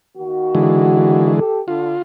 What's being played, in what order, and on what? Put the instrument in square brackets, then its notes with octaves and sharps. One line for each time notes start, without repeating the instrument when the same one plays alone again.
[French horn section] D#3 A#3 F#4
[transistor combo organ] D3 E3 G#3
[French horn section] G4 A4
[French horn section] D3 [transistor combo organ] F4